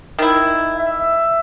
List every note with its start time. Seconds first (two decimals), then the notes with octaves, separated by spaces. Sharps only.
0.18 D#3 E4
0.77 E5